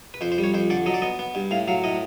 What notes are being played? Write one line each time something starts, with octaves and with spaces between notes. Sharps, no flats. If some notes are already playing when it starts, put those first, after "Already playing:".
B4
F2 C5
C5
G3
C#5
F2 C5
D3 D5
F#3 D#5
D5
B3 D#5
B3
G2
A2 F5
F#3 F5
A2 D#5